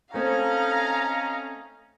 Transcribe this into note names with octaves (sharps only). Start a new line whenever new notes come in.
A3 C4 C#4 D#4 A4 F5 A#5